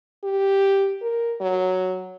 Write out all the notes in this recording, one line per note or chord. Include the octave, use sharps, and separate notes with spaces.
G4
A#4
F#3